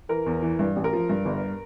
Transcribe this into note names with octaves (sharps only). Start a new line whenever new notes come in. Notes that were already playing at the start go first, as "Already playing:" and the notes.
E3 A#4
E2
E3
G2
A1
A#4
F3
G2
G1